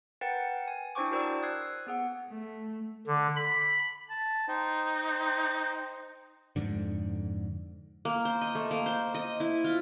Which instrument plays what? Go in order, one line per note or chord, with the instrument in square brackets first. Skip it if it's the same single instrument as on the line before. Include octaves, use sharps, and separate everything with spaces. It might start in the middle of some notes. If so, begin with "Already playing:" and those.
[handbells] A#4 B4 F#5 G5 A6 C#7
G#5
D4 E4 C5 G5 C#6 D6
F#4 A#4 C5 D5 A5 E6
D#6 F#6 G#6 C7
B3 G#4 F#5
[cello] A3
[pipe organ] D3
B5
[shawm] A5
[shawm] D#4 [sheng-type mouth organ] C5 G5
[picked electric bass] F2 G#2 D3
[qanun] A#3
C5
D#5
A3
A#3
C5
D#5
E4
F4